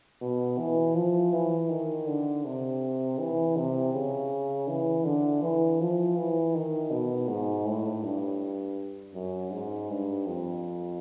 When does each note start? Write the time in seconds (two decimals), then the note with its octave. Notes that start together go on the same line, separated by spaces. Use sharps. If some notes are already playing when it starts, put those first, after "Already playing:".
0.21 B2
0.58 E3
0.95 F3
1.33 E3
1.69 D#3
2.07 D3
2.44 C3
3.19 E3
3.57 C3
3.93 C#3
4.68 E3
5.04 D3
5.42 E3
5.80 F3
6.16 E3
6.54 D#3
6.91 B2
7.28 G#2
7.65 A2
8.03 G2
9.14 F#2
9.52 G#2
9.90 G2
10.27 F2